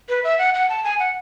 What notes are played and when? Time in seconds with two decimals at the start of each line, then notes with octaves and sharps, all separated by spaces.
0.09 B4
0.24 E5
0.39 F#5
0.54 F#5
0.69 A5
0.84 G#5
0.99 F#5